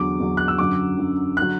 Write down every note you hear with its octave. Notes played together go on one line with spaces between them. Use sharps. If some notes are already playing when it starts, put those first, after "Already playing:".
Already playing: E2 D3 F#3 D6
E2 D3 F#3
F#6
E6
F#2 D3 F#3 D6
F#2 D3 F#3
F#6
D3 F#3